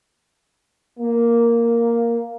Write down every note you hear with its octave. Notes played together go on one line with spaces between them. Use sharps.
A#3